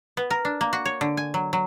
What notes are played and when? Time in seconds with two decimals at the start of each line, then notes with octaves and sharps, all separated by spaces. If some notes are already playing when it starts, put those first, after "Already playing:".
0.17 B3
0.30 A#4
0.45 D4
0.61 A#3
0.73 F#4
0.85 C#5
1.01 D3
1.17 G#5
1.34 F#3
1.53 F#3